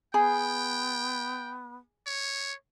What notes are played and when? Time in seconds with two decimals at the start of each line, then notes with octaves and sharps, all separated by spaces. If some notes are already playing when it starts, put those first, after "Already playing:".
0.14 B3 G#4 G5
2.07 C#5